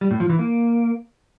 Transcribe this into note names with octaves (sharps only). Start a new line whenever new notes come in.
G3
A2
F3
E3
A#3